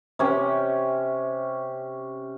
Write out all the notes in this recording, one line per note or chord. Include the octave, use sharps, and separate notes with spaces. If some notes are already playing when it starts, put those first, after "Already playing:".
C3 C#4 G4